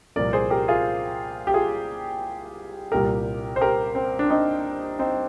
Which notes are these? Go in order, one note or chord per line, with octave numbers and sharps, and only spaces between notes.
C2 A#2 F3 A#4 D5
G#4 C5
G4 A#4
F4 G#4
G4
F4 G#4
C2 A#2 G3 G4 A#4
C5
G4 A#4
C4
D4
C4 D#4
C4 D#4